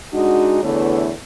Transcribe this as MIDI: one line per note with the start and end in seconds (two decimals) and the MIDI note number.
0.13 0.62 56
0.13 0.62 62
0.13 0.62 63
0.13 0.62 66
0.62 1.11 40
0.62 1.11 50
0.62 1.11 57
0.62 1.11 59
0.62 1.11 64
0.62 1.11 73